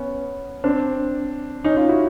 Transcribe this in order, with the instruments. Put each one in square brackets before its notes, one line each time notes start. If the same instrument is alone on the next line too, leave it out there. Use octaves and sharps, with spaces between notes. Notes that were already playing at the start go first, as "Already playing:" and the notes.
Already playing: [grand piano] B3 C#4
C4 D4
C#4 D#4
D#4 F4
E4 F#4